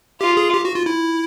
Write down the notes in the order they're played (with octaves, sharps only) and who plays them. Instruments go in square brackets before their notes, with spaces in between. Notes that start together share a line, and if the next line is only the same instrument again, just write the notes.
[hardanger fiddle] F4 [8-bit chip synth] G4
[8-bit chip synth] G#4
G4
F#4
F4
E4